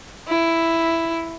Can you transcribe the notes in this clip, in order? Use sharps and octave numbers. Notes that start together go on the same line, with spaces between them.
E4